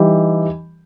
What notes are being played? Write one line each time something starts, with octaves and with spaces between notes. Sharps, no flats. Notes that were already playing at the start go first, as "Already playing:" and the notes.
Already playing: E3 G3 D#4 G4